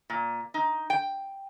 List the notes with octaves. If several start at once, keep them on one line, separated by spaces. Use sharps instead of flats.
A#2
D#4
G5